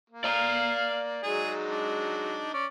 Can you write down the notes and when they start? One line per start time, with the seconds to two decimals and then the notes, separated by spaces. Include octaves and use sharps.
0.10 A#3
0.24 D5 F5 A#5
1.23 F#3 G#3 D#4 G#4
1.71 D4
2.54 C#4 D5